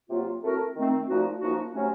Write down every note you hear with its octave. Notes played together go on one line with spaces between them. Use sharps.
C3 F#3 A#3 F4
A2 A3 C4 F#4 A#4
D#3 A3 C4
A#2 F3 A3 D#4 F#4
F#2 F3 A#3 D#4 F#4
C3 F#3 A3 C#4